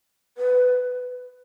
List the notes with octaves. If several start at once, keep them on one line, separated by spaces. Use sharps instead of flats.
B4